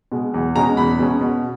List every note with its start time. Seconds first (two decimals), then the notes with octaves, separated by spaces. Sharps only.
0.12 B2 G#3
0.34 E2
0.55 B2 G#3 C#4 A#5
0.77 E2 B5
0.99 B2 G#3 C#4
1.21 B2